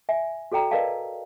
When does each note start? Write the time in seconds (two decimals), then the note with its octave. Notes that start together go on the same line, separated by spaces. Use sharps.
0.09 E5 G#5
0.52 F#4 A4 D5 G5 A#5
0.71 A#4 B4 D5 D#5 F5 A5